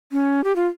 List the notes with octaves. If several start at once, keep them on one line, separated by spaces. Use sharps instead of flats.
C#4
G4
F4